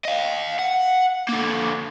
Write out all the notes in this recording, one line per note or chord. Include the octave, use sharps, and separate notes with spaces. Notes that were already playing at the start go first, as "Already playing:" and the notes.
D#5 F5
F#5
D3 A#3